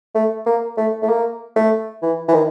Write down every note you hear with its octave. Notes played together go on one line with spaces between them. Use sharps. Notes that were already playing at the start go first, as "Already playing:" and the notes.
A3
A#3
A3
A3
A#3
A3
E3
E3
D#3